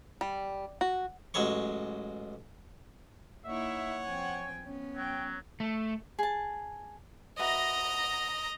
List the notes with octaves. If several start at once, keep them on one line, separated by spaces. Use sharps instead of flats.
G3
F#4
A1 F#3 G#3 C#5 C#6
A#3 D#4 E4 C#5 E5 F#5
F3 C4 G5 G#5
B3 C#4
F#3 G5
A3
G#4 A5
F#4 B4 D#5 E5 A#5